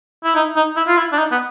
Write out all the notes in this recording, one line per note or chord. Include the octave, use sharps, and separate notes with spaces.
E4
D#4
D#4
E4
F4
E4
D4
D#4
B3